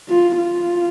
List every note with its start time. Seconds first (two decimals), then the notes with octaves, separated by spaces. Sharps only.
0.09 F4
0.37 F4